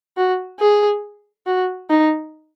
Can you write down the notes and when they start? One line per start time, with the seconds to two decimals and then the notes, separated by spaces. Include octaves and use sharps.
0.17 F#4
0.60 G#4
1.47 F#4
1.90 D#4